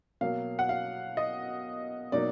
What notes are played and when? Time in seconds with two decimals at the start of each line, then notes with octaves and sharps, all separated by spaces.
0.21 B2 F#3 A#3 F5
0.59 F#5
0.69 F5
1.17 D#5
2.12 B2 F#3 A#3 D#4 D5